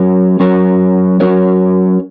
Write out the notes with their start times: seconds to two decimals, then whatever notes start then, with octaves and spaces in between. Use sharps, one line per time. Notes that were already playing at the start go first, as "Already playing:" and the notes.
Already playing: F#3 C#4 F#4 A#4 C#5
0.40 F#3 C#4 F#4 A#4 C#5
1.20 F#3 C#4 F#4 A#4 C#5